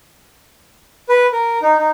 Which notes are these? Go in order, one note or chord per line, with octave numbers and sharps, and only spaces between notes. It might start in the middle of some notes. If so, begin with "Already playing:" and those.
B4
A#4
D#4
D#4